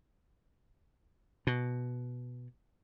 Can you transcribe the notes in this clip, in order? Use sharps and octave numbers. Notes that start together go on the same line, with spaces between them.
B2